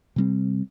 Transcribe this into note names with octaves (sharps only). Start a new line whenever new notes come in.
C3 G3 C4